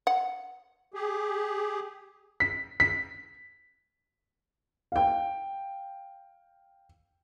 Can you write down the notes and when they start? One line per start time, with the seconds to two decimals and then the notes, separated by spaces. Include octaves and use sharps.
0.07 F#5
0.94 G4 G#4
2.40 B6
2.80 B6
4.92 F5 G5